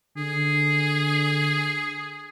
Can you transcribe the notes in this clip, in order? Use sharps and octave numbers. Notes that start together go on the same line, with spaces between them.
D3 G#4